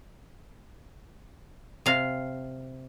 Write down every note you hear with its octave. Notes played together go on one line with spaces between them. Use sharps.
C3 F5